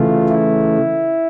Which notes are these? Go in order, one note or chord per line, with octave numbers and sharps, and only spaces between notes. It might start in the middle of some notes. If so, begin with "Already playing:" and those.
Already playing: C#3 E3 A3 F4
E4